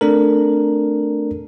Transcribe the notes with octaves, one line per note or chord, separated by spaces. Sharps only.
A3 C4 D4 A4 A#4